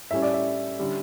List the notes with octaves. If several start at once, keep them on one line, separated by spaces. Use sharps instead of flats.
A2 G3 C#4 E5
D5
E5
D3 G3 C#4